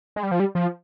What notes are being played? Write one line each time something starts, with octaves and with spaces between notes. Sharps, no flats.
G#3
G3
F3
G3
F3